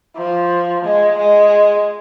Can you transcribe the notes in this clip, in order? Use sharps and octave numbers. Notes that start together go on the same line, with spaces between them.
F3
G#3
G#3